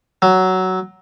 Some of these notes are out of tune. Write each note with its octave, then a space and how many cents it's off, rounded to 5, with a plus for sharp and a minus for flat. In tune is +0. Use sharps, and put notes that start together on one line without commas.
F#3 +10